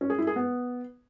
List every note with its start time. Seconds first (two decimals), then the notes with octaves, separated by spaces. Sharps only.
0.01 C#4
0.10 G#4
0.18 E4
0.27 G#4
0.36 B3